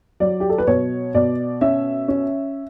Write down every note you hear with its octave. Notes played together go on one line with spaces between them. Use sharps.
F#3 D5
G4
A4
B4
B2 C#5
B2 D5
C#4 E5
C#4